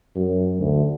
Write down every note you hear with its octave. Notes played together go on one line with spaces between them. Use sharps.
F#2
D2